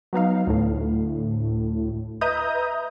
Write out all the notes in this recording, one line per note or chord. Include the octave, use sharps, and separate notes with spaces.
F#3 B3 D#4 F5
D2 A2
B4 D#5 E5 A#5 D#6 G6